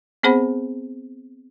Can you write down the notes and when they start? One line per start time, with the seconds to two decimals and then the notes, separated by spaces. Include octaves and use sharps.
0.23 B3 C4 G#4 C5 F#5 B5